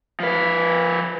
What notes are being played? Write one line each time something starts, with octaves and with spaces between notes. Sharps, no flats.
F3 B4